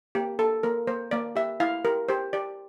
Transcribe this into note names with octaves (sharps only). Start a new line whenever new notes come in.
A#3 G4
A#3 A4
A#3 A#4
A#3 C5
A#3 D5
G4 E5
E4 F5
G4 A#4
G4 C5
G4 D5